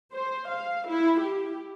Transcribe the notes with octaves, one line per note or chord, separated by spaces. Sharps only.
C5
F5
E4
G4